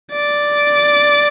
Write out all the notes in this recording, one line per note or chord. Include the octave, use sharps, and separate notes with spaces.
D5